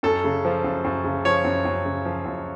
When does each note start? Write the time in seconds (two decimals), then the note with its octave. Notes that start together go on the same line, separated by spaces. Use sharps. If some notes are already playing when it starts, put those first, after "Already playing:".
0.03 F#2 A4
0.24 C#3
0.45 F3
0.64 F#2
0.85 F#2
1.04 C#3
1.25 F3 C#5
1.45 F#2
1.65 F#2
1.85 C#3
2.05 F3
2.26 F#2